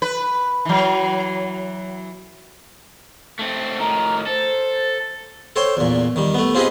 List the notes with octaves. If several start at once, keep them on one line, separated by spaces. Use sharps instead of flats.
B4
E3 F#3
A3 C4
A2 D#3 A#5
A4 C5
A4 C5 C#5 G5
E2 A#2
D#3 G3
A3 B3
C4 F4 G4 G#4 B4 D#5